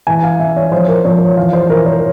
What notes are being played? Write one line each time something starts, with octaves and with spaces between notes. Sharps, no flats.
E3 G#5
F5
E3 E5
C#5
F3 C5
A#4
F3 C#5
E3 F5
C5
E3 A#4
C#5